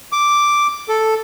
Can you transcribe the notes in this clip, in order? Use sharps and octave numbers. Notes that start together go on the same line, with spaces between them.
D6
A4